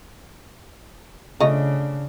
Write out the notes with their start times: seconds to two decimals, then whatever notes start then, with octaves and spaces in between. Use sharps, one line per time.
1.40 C#3 A3 D4 F4 D#5